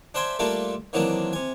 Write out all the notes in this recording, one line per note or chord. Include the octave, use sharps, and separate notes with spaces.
D4 C5 E5 G5 G#5
G3 A3 A#3 D4 F4 A4
D#3 E3 F#3 A#3 C4 D4
C3 G#5